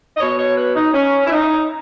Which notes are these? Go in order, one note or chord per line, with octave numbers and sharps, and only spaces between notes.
D#5
B2 C#5
C#5
B4
D#4
C#4
E4
D#4